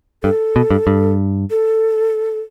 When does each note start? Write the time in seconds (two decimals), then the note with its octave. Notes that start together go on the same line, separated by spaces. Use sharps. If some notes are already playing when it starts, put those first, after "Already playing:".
0.23 G2 A4
0.56 B2
0.70 G2
0.87 G2
1.50 A4